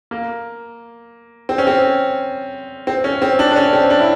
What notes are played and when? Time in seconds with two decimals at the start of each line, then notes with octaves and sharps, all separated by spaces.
0.11 A#3
1.49 C4
1.58 C#4
1.67 C4
2.87 C4
3.04 C#4
3.22 C4
3.39 D4
3.51 D4
3.56 C#4
3.73 C4
3.90 D4
4.00 E4